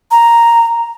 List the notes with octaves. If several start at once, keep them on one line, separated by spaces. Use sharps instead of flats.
A#5